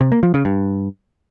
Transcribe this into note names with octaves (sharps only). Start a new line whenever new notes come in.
C3
A#3
F3
C#3
G2